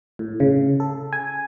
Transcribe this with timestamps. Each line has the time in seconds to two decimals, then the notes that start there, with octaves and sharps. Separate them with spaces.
0.19 A2
0.40 C#3
0.80 A4
1.13 G#5